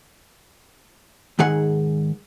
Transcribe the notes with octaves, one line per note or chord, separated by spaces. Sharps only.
G#2 D#3 G#4 F#5